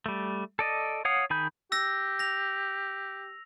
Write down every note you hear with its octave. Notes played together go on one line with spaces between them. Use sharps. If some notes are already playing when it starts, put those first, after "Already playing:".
G3 A3
A4 D5 D#5
C#5 F5 F#5 D#6
D#3 G#4 B5 G6
G4 E6 A#6
A#6 F7